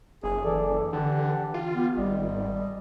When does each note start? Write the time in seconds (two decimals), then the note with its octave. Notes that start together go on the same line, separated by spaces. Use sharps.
0.23 F#1 G#4
0.45 E3 A4 D5
0.93 D3 G4 F#5 A5
1.54 F4
1.75 B3 G4
1.97 G#1 G3 D#5